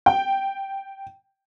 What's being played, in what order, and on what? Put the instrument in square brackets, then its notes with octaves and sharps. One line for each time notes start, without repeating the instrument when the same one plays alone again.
[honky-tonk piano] G5